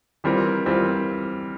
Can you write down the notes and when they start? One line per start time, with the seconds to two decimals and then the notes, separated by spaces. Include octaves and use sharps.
0.24 E3 G3 C4 F4 A#4
0.66 E3 G3 C4 F4 A#4